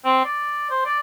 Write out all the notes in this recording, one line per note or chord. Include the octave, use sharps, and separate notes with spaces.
C4
D5
C5
D5